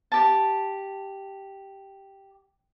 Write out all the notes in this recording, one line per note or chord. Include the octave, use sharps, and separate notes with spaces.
G4 A5